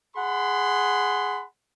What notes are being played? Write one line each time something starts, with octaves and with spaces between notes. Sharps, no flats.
G#4 F#5 B5 C6